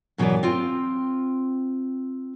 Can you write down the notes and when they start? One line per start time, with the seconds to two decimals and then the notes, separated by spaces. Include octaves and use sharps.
0.18 F#2 B2 E3 C#5 D5
0.43 C4 F4 G5